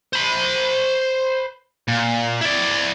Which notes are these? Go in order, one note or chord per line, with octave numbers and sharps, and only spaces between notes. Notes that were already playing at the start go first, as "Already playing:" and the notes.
C5 B5
A#2
E4 D5